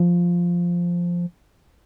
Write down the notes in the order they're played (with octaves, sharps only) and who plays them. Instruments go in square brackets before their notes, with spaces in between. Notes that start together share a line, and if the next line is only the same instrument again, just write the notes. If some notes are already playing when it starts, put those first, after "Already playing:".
Already playing: [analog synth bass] F3